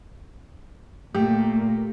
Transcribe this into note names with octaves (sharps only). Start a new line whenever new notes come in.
A#2 A3 A#3 G4